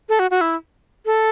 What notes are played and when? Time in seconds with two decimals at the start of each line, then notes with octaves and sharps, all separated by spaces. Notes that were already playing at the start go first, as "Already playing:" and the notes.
0.09 A4
0.19 F#4
0.31 F#4
0.41 E4
1.06 A4